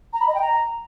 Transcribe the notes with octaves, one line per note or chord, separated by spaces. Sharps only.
A#5
B5
D#5
G5
A#5